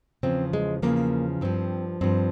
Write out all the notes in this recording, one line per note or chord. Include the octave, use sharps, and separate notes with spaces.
E2 C#3 F3 C4
G#3
E2 C#3 F3 A#3
G2 F3 C4
G2 F3 C4